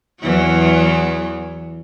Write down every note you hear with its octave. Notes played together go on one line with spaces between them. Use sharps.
E2 E3 F#3